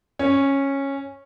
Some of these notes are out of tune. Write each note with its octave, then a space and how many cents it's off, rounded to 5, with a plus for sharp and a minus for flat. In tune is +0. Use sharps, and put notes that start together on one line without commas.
C#4 -10